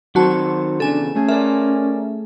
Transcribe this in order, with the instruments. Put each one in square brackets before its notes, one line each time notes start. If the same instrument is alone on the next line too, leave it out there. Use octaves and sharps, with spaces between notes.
[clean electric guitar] D#3 C4 A4 [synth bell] F#3 F#4 A5
[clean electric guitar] E2 C#3 [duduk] D4 [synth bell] A4 G#5
[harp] A3 G#4 [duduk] C#4
[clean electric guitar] A#4 D5 [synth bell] E5